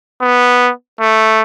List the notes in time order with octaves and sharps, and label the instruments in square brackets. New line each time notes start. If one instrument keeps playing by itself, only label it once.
[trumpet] B3
A3